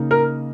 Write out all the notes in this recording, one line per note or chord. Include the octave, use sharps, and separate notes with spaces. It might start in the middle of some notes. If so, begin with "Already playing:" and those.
Already playing: C#3 A#3 D#4
A#4